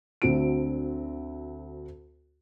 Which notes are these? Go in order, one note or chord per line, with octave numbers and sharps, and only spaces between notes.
D2 D3 C4 F#4 C5 D7